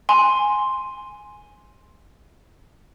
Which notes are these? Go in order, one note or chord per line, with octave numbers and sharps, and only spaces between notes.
G#5 C6